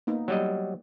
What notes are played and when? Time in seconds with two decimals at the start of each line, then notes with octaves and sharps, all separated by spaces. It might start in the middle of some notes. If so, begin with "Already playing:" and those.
0.07 A#3 B3 D#4
0.28 F#3 G3 D#5